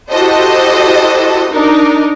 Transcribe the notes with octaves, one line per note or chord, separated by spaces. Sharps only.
E4 F#4 G4 A4 C5 D#5
D4 D#4 A#4